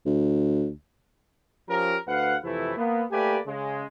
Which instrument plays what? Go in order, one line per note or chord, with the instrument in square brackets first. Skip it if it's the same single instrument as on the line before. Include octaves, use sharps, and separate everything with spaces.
[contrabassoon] D2
[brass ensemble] F3 C#4 G4 A#4
D2 B4 F5 F#5
F2 C3 E3 A3 E4
A#3 B3
A3 A#3 G4 B4 D5 G#5
C#3 G#3